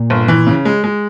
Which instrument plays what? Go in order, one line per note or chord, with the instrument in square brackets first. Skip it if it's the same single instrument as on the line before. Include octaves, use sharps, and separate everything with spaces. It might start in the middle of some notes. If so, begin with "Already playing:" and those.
Already playing: [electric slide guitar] A#2 A#3
[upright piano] G1
E3
C#3
G#3
G#3